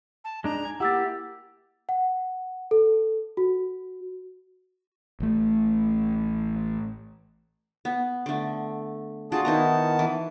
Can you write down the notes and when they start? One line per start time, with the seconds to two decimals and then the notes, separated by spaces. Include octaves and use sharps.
0.25 A5
0.44 G#3 D4 D#4 A#5
0.65 G#5
0.80 A#3 E4 G4 F#5 E6 A6
1.89 F#5
2.71 A4
3.37 F#4
5.20 A1 A3
7.85 B3
8.26 D3 A3
9.32 D4 F4 F#4 G#4 A5
9.45 D#3 B3 D#4 E4 A5 A#5
9.99 E3